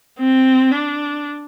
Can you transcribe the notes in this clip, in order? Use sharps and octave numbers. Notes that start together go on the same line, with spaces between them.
C4
D4